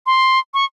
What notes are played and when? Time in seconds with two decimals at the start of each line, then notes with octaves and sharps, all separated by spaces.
0.06 C6
0.54 C#6